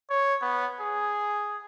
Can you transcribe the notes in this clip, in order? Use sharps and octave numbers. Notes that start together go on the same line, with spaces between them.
C#5
B3
G#4